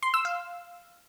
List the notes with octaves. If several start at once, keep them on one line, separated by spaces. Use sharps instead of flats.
C6
E6
F5